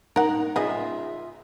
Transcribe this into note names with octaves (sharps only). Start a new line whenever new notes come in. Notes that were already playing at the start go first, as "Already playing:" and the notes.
D#4 A#4 F#5
C#3 F4 G#4 D#5 E5